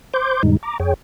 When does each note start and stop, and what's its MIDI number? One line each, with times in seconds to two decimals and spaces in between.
0.14 0.42 72
0.14 0.42 84
0.14 0.42 86
0.14 0.42 91
0.43 0.57 41
0.43 0.57 45
0.43 0.57 50
0.43 0.57 55
0.43 0.57 56
0.43 0.57 63
0.63 0.78 82
0.63 0.78 86
0.80 0.94 41
0.80 0.94 68
0.80 0.94 73
0.80 0.94 79